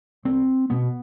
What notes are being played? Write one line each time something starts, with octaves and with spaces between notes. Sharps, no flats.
C2 C4
B2 B3